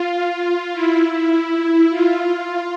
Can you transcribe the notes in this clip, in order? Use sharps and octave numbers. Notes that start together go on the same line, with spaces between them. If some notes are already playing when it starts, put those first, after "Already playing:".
Already playing: F4
E4
F4